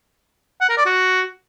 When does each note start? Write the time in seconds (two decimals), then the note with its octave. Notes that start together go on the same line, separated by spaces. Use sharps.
0.61 F#5
0.69 A#4
0.78 D5
0.86 F#4